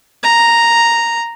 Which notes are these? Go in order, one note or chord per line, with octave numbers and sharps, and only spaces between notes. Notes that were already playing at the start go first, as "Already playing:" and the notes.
A#5